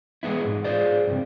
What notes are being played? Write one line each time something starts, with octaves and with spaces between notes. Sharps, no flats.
E3 G#3 B3 E4
G#2
G#4 C5 D5
G2 C3